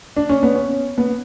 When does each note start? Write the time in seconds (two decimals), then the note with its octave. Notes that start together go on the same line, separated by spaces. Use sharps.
0.17 D4
0.29 C#4
0.43 B3
0.55 C#4
0.98 B3